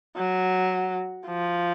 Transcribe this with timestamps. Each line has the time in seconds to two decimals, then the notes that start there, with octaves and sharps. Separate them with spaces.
0.16 F#3
1.27 F3